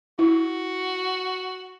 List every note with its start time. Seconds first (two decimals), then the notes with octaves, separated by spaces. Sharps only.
0.19 E4 F#4